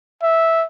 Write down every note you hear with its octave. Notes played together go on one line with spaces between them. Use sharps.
E5